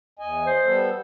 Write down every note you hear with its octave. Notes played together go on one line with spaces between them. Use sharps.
E2 D#5 G#5
C5
G3 B3 A4